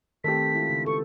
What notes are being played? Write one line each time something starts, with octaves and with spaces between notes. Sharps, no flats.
D#3 A3 C4 G4 B6
G#3 E4 F4
C#3
A4 B4 C#6